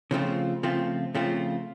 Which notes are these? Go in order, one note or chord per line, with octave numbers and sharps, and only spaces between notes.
C#3 F3 A3 C4 F4
C#3 F3 A3 C4 F4
C#3 F3 A3 C4 F4